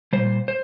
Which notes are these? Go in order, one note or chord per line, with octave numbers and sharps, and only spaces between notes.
A#2 G3 C5
C5